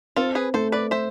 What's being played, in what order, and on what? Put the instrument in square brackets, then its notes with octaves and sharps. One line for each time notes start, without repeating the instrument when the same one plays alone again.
[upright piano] C4 [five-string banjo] F4 A4
[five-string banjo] G#4 B4
[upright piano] A3 [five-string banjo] A4 C5
[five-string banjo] B4 D5
C5 E5